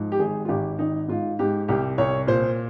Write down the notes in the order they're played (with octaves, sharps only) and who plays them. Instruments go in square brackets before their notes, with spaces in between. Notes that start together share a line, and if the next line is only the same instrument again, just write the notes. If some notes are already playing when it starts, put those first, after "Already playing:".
Already playing: [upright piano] G#2 F3
G4
G#1 G#4
F4
G#1 G4
G#1 D#4
G#2 F4
G#2 G4
C2 G4
C2 C#5
A#2 C5